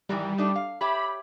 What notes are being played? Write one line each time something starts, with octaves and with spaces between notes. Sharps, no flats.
G#2 D#3 E3 G3
A3 D4 D#4
F5
G4 C#5 E5 B5